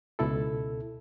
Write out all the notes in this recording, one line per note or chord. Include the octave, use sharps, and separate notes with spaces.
C#2 B2 E4 A4